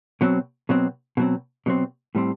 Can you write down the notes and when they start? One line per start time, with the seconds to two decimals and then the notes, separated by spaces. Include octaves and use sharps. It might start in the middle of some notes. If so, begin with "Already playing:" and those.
0.21 B2 F#3 C4
0.69 B2 F#3 C4
1.17 B2 F#3 C4
1.66 B2 F#3 C4
2.15 A2 G3 C4